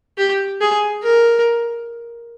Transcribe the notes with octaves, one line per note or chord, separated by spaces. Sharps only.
G4
G#4
A#4